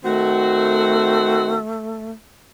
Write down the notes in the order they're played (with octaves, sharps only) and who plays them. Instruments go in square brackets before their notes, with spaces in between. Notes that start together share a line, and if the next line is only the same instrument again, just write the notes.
[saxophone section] D#3 C4 F#4 [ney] A3